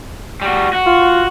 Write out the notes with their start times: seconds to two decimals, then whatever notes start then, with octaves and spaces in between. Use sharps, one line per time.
0.42 G3 F#4
0.73 F#4
0.86 F4